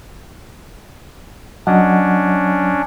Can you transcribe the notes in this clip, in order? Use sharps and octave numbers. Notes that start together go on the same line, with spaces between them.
F#3 C#4 D4 D#5 F#5